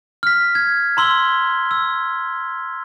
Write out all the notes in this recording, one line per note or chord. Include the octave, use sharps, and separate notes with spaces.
F6 B6
G#6
A#5 C6 E6 G7
E6